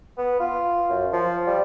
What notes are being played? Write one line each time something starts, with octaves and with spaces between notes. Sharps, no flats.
B3
F4
F#2
F3
G3